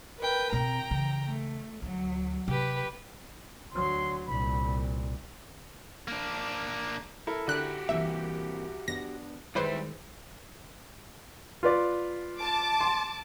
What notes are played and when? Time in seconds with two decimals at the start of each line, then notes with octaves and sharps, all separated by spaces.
0.18 A#4 B4 G5
0.53 B2 C4 G5 A#5
0.91 C#3 E3
1.25 A3
1.82 D2 F#3
2.48 C3 G4 B4
3.72 D2 F#3 C6
4.26 C2 A#2 B5
6.08 A#3 D4
7.27 E4 A4 A#4
7.48 D3 F#4 G4 F#6
7.89 C2 E3 A#3 C4 E5
8.88 B3 D4 A#6
9.55 D#3 G3 G#3 E4 B4 C5 D5 E5
11.63 F4 B4 D5
12.39 A5 D6
12.81 C6